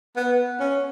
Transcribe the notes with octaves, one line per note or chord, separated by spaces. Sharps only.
B3
C#4